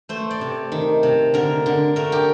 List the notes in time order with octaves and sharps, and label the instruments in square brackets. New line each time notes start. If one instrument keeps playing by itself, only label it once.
[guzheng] A3 C5
D5
C3
D#3
C3
D3 A#4
D3
A3 A#4
G4